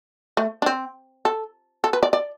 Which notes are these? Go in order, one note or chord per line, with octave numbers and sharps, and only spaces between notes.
A3
D4
C4
A4
A4
B4
D5
D5